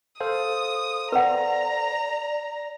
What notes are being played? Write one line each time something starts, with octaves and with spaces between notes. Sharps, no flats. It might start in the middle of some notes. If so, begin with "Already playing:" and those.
A4 C5 F5 D#6
B4 D5 F#5 A#5